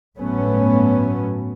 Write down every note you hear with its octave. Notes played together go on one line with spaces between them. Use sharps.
G1 A2 F#3 A3 B3 C#4